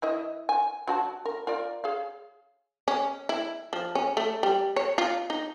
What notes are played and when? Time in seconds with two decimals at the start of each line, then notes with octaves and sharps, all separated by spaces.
0.02 E3 E4 D#5
0.49 G#5
0.87 F#3 F#4 A5
1.25 A#4
1.47 F4 A#4 D5
1.84 G#4 C#5 F5
2.88 C#4
3.29 E4
3.73 F3
3.95 C#4
4.17 A3
4.43 G3
4.76 C#5
4.98 F4
5.30 D#4